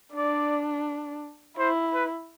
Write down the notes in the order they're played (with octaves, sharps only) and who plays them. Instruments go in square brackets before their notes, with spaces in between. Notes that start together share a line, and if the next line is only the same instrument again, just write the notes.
[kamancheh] D4 [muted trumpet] D5
[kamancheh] E4 [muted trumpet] C5
[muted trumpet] B4